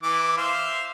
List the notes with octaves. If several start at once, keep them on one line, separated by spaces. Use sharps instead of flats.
E3 D6
C5 E5 F5